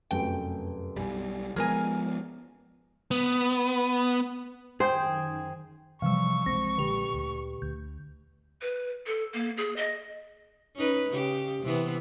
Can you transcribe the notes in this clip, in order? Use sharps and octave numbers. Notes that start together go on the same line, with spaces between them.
F1 F#2 A3 G5
B1 G3 G#5
F3 G#3 B3 G#4 A#4 G#5 F6
B3
F#2 D#3 G#4 C5 G5 G6
C3 E3 F3 G3 F5 C#6 E6
B1 F3 G#3 C4 A#6
A#2 D3 G4 B4 F7
D2
D2 G6
B4
A4
A#3
G#4
D#5
C#4 D#4 B4
C#3 G4
C3 E3 B3